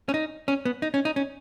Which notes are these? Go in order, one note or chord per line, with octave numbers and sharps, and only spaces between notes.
C#4
D#4
C#4
B3
D#4
C#4
D#4
C#4